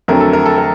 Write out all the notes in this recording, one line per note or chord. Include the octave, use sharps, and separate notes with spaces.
F2 D3 F#3 A3 A#4
A4
A#4
A4
A#4